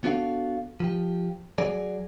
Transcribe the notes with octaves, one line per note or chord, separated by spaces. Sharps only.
B3 D4 F#4 A4 D#5 F5
F3 G4
F#3 G#4 D5